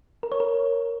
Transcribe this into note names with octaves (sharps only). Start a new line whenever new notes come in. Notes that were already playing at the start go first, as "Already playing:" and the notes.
A#4
C#5
A#4